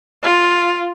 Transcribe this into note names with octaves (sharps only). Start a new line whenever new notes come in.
F4